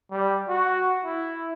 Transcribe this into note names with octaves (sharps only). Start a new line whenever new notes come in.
G3
F#4
E4